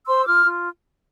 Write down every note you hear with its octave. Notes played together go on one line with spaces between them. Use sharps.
C5 C6 E6
F4 D6 F6
F4